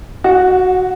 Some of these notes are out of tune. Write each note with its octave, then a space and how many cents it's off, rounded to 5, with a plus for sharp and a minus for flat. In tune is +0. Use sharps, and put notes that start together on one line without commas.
F#4 +0 F#5 -30